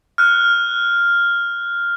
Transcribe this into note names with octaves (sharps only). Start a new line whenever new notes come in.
F6 F#6